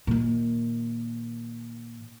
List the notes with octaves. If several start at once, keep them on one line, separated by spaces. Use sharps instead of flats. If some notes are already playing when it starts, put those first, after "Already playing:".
A#2 D#3